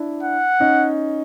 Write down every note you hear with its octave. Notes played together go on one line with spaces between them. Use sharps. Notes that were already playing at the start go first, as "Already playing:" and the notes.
Already playing: D4 E4
F#5
C#4 D#4